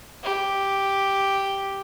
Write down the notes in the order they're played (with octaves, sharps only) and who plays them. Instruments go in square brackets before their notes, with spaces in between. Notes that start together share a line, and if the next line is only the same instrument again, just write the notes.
[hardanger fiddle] G4